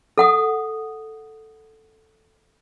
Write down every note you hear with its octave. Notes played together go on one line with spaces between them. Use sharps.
A4 F#5 D#6